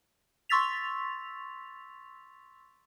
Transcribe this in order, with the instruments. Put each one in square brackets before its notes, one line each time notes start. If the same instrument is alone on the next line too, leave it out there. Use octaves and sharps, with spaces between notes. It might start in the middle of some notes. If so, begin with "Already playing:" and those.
[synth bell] C6 C#6 E6 A6 B6 F7